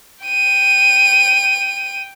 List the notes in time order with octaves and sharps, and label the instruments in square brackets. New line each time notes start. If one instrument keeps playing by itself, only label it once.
[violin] G5 D#7